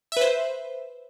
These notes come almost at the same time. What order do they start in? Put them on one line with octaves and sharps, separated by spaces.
E5 B4 C5